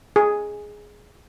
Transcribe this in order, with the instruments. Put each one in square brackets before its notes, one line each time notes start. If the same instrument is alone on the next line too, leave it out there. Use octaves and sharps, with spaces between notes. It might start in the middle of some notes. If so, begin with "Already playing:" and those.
[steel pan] G#4